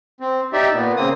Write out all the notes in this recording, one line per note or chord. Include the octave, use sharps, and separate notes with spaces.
C4
D#4 G4 D5 E5
A#2 B3
C#3 A#3 C4 D#6